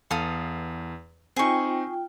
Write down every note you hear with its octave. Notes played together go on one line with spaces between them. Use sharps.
E2 A4 F5 D#6
C4 D#4 F4 G#4 G5 C#6